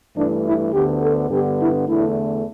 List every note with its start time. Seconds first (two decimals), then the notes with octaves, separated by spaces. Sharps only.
0.15 G2 E3 A3 D4
0.44 E4
0.72 D2 D3 B3 G4
1.01 A4
1.30 G2 D3 B3 G4
1.59 E4
1.87 E2 D3 A3 E4